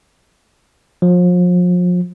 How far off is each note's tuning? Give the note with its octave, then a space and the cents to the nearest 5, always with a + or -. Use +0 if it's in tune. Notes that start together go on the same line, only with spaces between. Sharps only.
F3 +35